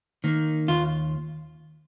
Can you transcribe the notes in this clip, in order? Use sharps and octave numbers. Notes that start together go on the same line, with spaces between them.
D#3 A#3
D#2 F4